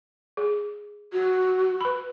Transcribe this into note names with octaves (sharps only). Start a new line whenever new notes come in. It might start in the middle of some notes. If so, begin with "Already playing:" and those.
G#4
F#4
B4 B5